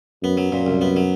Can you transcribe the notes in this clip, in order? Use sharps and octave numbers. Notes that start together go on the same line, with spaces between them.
F#2 B3
F#3
F#2 A#2
C2
B3
F#3